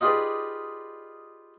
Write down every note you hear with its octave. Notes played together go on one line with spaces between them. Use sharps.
D#4 F4 G4 G#4 B4 D5